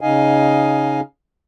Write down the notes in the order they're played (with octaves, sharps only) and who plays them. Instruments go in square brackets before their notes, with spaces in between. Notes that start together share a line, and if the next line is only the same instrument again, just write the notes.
[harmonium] C#3 D#4 D#5 F5 G#5